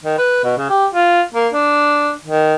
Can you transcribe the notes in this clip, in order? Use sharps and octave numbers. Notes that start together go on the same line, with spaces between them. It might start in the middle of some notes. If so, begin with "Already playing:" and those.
D#3
B4
B2
C#3
G4
F4
A#3
D4
D#3